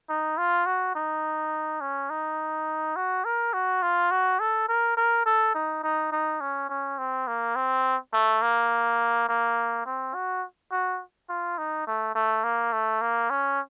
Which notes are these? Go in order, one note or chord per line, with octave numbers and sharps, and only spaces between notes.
D#4
F4
F#4
D#4
C#4
D#4
F#4
A#4
F#4
F4
F#4
A4
A#4
A#4
A4
D#4
D#4
D#4
C#4
C#4
C4
A#3
C4
A3
A#3
A#3
C4
F#4
F#4
F4
D#4
A3
A3
A#3
A3
A#3
C#4